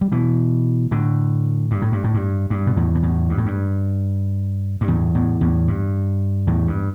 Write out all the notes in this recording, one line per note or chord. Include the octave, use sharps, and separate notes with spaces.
G3
B2 E3
A2 D3
G2
A2
G2
A2
G2
G2
B2
E2 A2
B2
E2 A2
G2
A2
G2
G2
E2 A2
E2 A2
E2 A2
G2
E2 A2
G2